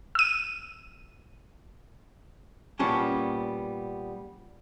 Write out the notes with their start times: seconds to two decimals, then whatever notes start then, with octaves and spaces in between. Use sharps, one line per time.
0.15 E6 D#7
2.79 A#2 G3 B3 C#4 A5